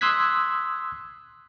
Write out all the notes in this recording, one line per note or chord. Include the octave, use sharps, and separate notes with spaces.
C6 D#6 E6 F#6 G#6 B6